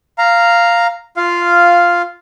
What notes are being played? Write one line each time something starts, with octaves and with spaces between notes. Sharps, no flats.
F5 A#5
F4 F5